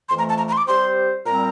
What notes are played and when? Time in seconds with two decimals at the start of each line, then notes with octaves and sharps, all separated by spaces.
0.09 F2 E3 A3 C6
0.19 A#5
0.29 A5
0.38 A#5
0.48 A#5
0.52 C6
0.57 D6
0.68 G3 C4 G4 C5 C6
1.25 A#2 G3 C4 A#5